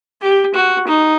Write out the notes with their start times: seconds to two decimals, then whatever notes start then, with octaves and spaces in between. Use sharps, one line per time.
0.21 G4
0.54 F#4
0.87 D#4